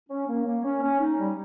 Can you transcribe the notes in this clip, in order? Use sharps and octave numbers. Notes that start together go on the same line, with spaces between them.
C#4
A#3
A#3
C#4
C#4
D#4
G3